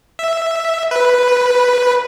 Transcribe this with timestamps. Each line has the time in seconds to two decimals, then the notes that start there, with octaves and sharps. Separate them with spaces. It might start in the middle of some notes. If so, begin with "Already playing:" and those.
0.19 E5
0.91 B4